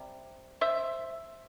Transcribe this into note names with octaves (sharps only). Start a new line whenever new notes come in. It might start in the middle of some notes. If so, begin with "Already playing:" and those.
Already playing: C3 G3
C5 E5